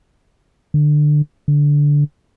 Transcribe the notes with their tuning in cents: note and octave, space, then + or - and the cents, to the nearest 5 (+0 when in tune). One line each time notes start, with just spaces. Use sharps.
D3 +20
D3 -10